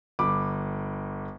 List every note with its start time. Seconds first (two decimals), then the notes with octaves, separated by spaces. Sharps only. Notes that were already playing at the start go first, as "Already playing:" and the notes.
0.19 G1 B5 D6